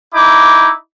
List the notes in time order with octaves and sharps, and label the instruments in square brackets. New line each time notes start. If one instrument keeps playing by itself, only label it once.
[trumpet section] D#4 E4 D6